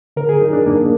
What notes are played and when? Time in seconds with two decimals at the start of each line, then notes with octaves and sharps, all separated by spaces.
0.17 D3 A#4
0.29 G#4
0.41 F#3 D#4
0.53 D4
0.65 F#2 A#3